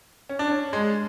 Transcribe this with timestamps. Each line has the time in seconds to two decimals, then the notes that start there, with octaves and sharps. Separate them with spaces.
0.29 C#4
0.39 D4
0.50 C#4
0.73 G#3